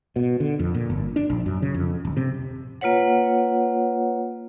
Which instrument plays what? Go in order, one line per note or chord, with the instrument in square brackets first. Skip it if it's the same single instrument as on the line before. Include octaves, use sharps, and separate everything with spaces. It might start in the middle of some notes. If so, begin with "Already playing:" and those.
[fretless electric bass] B2
D3
F2
A#2
G1
D4
A#1
F#2
C#3
F2
D1
C3
[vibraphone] A#3 F4 B4 C#5 F#5